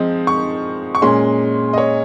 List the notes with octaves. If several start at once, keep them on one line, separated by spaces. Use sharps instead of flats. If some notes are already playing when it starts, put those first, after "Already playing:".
Already playing: F3 G#3 C4 D#4
C#6
C#6
A#2 G#3 C#4 C6
D#5
C#5